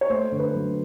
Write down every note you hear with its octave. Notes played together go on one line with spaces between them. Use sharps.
C#5
A3 C5
D3
B4
F#3